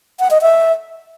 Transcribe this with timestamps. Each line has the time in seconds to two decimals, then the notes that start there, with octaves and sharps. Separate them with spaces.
0.20 F#5
0.31 D#5
0.42 E5